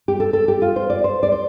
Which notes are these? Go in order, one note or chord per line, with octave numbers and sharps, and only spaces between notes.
G4
A4
A4
G4
F4
C5
D5
C5
D5
C5